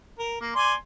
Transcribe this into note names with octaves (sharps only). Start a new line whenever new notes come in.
A#4
A#3
D5 G#5 C6